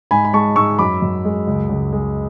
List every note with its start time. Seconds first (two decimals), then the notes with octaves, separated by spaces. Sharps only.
0.11 G#2 G#5 B5
0.25 B5
0.33 G#3 A5 C#6
0.56 G#2 C#6 E6
0.78 F#2 B5 D6
1.02 F#2
1.25 G#3
1.47 C#2
1.69 C#2
1.93 G#3